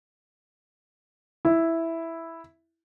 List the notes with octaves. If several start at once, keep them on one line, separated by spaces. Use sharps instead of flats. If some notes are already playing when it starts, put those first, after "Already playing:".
E4